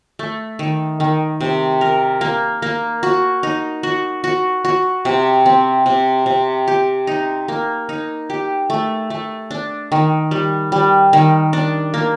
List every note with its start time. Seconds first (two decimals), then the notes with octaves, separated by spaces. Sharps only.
0.19 A3
0.59 D#3
1.00 D#3
1.41 C3
1.81 A#4
2.21 A#3
2.62 A#3
3.03 F#4
3.43 D#4
3.83 F#4
4.24 F#4
4.65 F#4
5.05 C3
5.46 C4
5.86 C3
6.26 C3
6.68 G4
7.07 D#4
7.48 A#3
7.89 D#4
8.30 G4
8.70 A3
9.10 A3
9.51 D4
9.92 D#3
10.31 G3
10.72 G3
11.13 D#3
11.53 D4
11.94 A#3